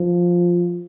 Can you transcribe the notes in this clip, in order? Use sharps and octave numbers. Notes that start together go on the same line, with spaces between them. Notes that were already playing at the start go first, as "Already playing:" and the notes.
Already playing: F3